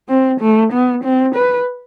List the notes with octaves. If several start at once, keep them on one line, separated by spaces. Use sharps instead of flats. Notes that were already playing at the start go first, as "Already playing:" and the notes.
C4
A3
B3
C4
B4